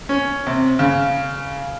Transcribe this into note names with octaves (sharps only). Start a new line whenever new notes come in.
C#4
C3
C#3